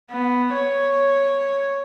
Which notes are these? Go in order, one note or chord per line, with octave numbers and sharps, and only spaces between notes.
B3
C#5